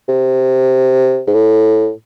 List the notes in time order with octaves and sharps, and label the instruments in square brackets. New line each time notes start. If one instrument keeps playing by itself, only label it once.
[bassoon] C3
G#2
A2